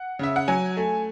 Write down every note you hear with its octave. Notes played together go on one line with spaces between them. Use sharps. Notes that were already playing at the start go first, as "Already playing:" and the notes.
Already playing: F#5
C#3 E5
F#5
F#3 G#5
A3